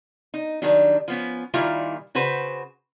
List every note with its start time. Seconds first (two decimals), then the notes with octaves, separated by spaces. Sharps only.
0.34 D#4
0.62 D#3 F#3 G3 D4
1.08 F3 B3 C#4
1.54 A#2 D#3 G3 A#3 E4 F4
2.15 C#3 F#4 B4 C5